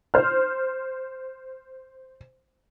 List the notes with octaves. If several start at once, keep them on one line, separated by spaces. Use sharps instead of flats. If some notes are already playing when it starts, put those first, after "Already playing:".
C5 F6